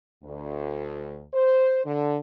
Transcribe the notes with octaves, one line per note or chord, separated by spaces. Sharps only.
D2
C5
D3